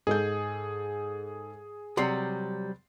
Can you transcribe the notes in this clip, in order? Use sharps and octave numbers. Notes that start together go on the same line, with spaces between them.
G#2 G#4 A4 G6
C3 F#3 G3 C6 C7